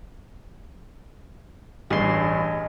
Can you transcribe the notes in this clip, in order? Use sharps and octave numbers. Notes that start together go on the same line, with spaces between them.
A1 G2 G#4 D#5 C6